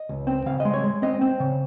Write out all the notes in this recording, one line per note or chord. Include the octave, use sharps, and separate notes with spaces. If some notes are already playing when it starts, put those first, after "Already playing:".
Already playing: D#5
C#2
C4
C#3 F5
D#5
G#3
C#5
G#3
C4 D#5
C4
C#3